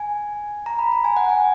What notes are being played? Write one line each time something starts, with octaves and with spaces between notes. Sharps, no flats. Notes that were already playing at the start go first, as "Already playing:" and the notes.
Already playing: G#5
A#5
B5
A#5
G#5
F#5
G#5